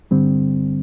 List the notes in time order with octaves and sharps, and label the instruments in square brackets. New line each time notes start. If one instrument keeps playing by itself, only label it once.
[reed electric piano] G2 D3 G3 C4